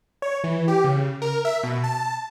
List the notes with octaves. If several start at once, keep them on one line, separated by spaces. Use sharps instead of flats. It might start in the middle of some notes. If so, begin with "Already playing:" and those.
C#5
E3
G4
C#3
A#4
E5
B2
A5